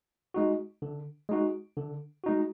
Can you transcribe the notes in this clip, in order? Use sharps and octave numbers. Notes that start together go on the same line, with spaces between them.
G#3 D#4 F#4
D3
G#3 D#4 F#4
D3
G#3 D#4 F#4